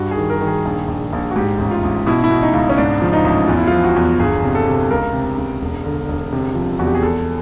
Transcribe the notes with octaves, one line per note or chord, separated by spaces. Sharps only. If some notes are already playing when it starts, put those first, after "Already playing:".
Already playing: G2 F#4
G#4
D#3
A#4
D#3
G#4
A#1
A#1
A#1
F#4
G#2 G4
A1
F4
A1
B2 E4
E4
B2
D#4
C#2
C#4
G#2 D4
F3
D#4
A1
E2 F4
E4
F3 F4
F#4
E2
G1 G#4
C3
A4
C3
C#2 A#4
C3
C#2
E1
D3
E1
C3
F3
E2 F#4
G4
G#4
E2 A4